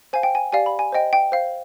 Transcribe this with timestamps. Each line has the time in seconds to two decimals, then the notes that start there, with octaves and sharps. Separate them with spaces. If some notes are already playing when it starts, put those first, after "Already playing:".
0.13 C5 F5 G#5
0.23 G5
0.35 G#5
0.52 G4 D5 F5 G#5
0.66 B5
0.79 G#5
0.92 C5 D#5 G5
1.13 G5
1.32 C5 F5